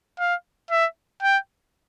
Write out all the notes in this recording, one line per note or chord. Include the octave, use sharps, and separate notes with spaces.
F5
E5
G5